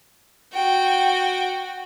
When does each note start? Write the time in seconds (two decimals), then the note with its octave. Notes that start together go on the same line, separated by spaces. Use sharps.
0.53 F#4 G5